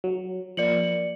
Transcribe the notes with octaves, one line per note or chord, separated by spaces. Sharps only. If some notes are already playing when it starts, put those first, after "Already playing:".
F#3
F3 A#3 D5 C#7 F#7